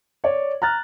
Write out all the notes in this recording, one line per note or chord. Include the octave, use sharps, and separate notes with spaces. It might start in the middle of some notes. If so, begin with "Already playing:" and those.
C#5 D5
A#5 F6 F#6 A6